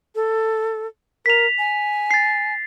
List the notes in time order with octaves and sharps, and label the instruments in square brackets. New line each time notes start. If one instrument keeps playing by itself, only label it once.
[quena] A4
[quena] A#4 [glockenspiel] B6 F7
[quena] G#5
[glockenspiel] A6 C7